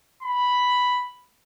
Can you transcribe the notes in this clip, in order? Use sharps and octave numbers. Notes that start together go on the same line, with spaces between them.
B5